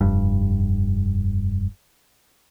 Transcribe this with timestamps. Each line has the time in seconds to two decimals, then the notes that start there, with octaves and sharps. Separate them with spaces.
0.01 F1 G2